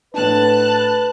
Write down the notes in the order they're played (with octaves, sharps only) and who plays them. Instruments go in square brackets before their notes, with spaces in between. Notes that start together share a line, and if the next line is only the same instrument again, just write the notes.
[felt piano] A2 D4 [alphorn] B4 [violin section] A5 F#6